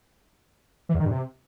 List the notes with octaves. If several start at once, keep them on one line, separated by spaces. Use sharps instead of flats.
E3
E2
D#3
G2
C3